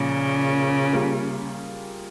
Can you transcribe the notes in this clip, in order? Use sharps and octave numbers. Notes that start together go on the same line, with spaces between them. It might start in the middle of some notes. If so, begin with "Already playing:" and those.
Already playing: A#2 C#3 F3 A#3
G3 A#3 F4 G#4